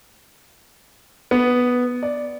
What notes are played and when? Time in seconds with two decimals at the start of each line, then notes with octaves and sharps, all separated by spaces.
1.31 B3
2.03 D5